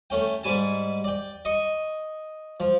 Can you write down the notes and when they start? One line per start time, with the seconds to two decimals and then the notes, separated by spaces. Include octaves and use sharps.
0.10 A3 C#4 G5
0.43 G#2 G3 G#5 A5
1.04 D5 G5
1.45 D#5 C#6 D#6
2.60 F3